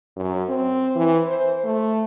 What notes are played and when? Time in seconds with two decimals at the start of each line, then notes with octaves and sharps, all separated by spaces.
0.16 F#2
0.49 C4
0.96 E3
1.27 C5
1.64 A3